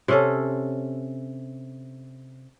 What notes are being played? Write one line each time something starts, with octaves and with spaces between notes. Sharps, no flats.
C3 C#4 A4